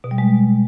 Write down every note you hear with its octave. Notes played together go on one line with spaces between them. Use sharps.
B2
G3
G#3